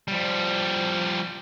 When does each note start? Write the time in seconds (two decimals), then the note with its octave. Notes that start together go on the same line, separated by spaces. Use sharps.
0.08 F3 G3